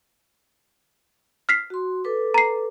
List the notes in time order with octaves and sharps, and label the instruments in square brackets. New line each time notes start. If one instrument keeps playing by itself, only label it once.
[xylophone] F6 B6 C7
[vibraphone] F#4 C6
A4 B4 D6
[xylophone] A#5 C7